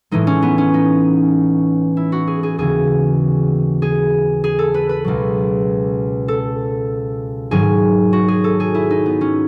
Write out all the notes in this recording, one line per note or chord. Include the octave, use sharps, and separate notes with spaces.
A2 E3 G#3 D#4
C#4
B3
C#4
D#4
E4
F#4
G#4
G#4
D#2 C#3 E3 G#4
G#4
G#4
A4
B4
B4
C#2 B2 F#3
A4
G#2 D#3 F#3 G#4
F#4
G#4
A4
G#4
E4
D#4
B3
C#4